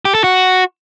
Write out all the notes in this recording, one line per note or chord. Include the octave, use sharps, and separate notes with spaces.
G4
A4
F#4